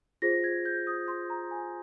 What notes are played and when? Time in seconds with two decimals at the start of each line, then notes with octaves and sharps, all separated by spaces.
0.22 F4 G#4 C5 A#6
0.44 G#6
0.65 G6
0.87 D#6
1.08 C6
1.30 A#5
1.51 G#5